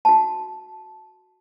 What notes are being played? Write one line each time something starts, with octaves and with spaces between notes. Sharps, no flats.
F#4 A5